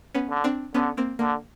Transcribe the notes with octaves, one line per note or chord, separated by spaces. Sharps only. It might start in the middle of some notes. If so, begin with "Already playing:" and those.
B3 C#4
D3
C4 D4
D3 B3 C#4
A#3 C4
D3 A#3